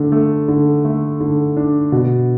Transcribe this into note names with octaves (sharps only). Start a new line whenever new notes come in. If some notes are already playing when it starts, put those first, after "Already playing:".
Already playing: D3 A3 D4
A3
D3
A3
D3
D4
B2